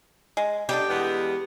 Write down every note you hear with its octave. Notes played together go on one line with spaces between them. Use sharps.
G#3
D3 G3 G4 D#5
E2 G#3 B3